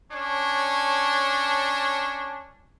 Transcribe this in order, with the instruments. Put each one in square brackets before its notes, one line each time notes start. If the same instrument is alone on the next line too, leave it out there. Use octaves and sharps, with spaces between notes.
[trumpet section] C#4 D4 C#5 A5